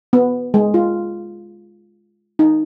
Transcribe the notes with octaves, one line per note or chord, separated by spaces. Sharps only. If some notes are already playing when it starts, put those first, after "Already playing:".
B3
G#3
F4
D#4